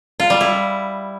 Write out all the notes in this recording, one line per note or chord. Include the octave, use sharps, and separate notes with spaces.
F4
G3
E4